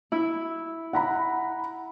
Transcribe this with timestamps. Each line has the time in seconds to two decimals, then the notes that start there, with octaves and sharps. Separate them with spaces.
0.12 E4
0.93 F#5 A#5 B5